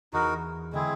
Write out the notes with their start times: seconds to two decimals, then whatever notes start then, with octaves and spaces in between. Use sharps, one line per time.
0.12 E2 E3 D#4 F#4 A#4
0.73 D3 G#3 C4 E4 G#4